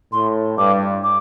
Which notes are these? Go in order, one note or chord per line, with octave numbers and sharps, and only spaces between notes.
A2 C6
G2 D6
D6